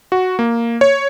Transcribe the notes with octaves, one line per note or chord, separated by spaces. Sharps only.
F#4
A#3
C#5